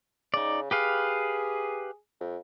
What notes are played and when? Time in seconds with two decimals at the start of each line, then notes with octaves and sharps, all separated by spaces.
0.34 C#3 D#4 D5
0.71 G4 G#4 B4 F5
2.21 F2